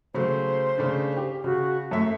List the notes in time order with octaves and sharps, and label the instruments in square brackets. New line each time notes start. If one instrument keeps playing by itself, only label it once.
[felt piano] C#3 F#3 A3 [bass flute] C5
[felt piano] C#3 A3 D4
G4
[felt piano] C#3 [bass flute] F#4
[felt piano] F#2 E5 [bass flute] A3